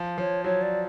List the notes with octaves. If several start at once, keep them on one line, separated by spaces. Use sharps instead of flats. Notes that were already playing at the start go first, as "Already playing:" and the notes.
Already playing: F3
F3 C#5
F#3 C#5
D5